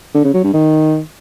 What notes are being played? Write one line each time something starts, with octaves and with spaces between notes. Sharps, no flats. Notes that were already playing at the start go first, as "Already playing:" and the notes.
D3
C#3
F#3
G2
D#3